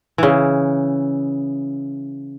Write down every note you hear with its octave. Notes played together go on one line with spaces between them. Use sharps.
C#3 E3